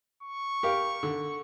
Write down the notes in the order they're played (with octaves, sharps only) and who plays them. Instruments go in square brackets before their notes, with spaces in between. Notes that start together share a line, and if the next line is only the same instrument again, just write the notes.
[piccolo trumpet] C#6
[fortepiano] G4 A#4 F5
D3